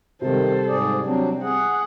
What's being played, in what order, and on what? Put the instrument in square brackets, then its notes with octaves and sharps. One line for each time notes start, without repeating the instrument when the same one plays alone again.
[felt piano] C3 G3 [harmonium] D#3 [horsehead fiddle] A4 C5
[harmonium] G#2 G#4 D5
[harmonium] F#3 D4 [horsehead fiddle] C4
[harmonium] G#4 [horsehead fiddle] F#5